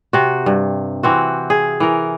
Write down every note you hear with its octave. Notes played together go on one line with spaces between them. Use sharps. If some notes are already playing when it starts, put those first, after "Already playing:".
C3 F#4
G2
E3 C4 F#4
G#4
E3 A#4